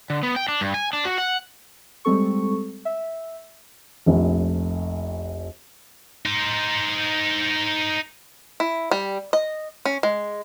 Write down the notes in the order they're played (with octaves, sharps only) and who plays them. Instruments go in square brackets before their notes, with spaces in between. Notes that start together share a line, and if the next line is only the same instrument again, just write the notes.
[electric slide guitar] D3
B3
G5
D4
G2
G#5
D4
F#4
F#5
[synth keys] G3 G#3 C4 A4 C#6
E5
[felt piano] F1 A#1
[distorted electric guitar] D#4 C5
[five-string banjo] E4
G3
D#5
C#4
G#3